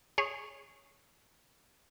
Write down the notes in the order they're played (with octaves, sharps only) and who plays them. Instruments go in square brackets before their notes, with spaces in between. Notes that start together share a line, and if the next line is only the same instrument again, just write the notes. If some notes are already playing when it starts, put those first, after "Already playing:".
[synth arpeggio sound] G#4 C#5